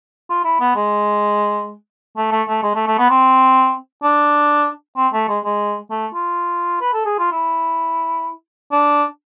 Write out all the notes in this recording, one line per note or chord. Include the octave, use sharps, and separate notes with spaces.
F4
E4
B3
G#3
A3
A3
A3
G#3
A3
A3
B3
C4
D4
C4
A3
G#3
G#3
A3
F4
B4
A4
G#4
F4
E4
D4